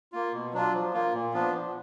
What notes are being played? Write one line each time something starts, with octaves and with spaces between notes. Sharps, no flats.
A#3 F4
B2
F#3 D4 F4
F3
A#3 F4
A#2
F3 B3 D4 F4
F3